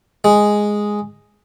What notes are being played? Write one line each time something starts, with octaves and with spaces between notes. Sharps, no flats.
G#3